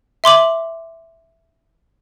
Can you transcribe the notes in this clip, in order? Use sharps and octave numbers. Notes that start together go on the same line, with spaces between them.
E5 C6 D6 F#7